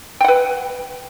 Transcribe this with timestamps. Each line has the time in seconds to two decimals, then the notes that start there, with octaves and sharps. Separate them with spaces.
0.21 G5
0.24 F#5
0.28 B4